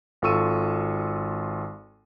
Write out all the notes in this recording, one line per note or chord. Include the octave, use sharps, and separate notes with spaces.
G#1 F4 A4 C#6 E6 D#7